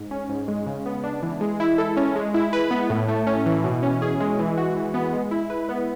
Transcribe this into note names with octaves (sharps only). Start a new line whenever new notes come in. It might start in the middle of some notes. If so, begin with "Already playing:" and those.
Already playing: G#2
C#4
G#2
G#3
C#3
B3
D4
E3
G#3
E4
A4
C#4
G#3
E4
B4
B3
A2
A3
C#4
E3
B2
C#4
G#4
G#3
E3
F#4
E3
B3
G#3
E4
B4
B3